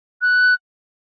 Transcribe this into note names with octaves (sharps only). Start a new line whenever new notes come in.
F#6